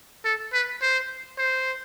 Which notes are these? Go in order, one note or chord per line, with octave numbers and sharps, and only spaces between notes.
A4
B4
C5
C5